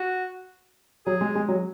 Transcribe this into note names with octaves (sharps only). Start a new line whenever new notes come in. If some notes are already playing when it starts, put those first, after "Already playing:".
Already playing: F#4
F#3 G#4
G#3
G#3
F#3